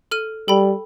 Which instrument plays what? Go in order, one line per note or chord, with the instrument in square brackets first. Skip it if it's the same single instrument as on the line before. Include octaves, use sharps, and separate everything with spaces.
[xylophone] A4 F6 D#7
[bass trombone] G3 [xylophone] A4 G5 B5